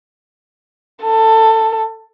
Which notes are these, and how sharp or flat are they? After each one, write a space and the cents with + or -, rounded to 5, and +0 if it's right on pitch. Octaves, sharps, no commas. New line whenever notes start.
A4 +20